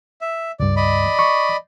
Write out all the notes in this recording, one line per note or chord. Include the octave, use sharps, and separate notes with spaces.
E5
C#2 G2 D5
D5 D#5 B5
C#6